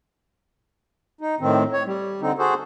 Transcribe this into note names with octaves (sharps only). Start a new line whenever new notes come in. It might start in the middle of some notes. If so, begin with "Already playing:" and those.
D#4
A2 D#3 C4
C#5
G3
D3 C4 D#4
F#4 G#4 A4 C5